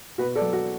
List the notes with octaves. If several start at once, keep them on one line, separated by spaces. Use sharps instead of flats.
B2 F#4 B4
A4 D5
F#3
F#4